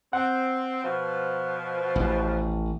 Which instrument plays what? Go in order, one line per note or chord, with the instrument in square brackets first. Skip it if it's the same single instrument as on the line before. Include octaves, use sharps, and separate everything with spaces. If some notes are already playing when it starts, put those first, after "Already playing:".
[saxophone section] C4 [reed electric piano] F#5
[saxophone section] B2 F3
[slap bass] A1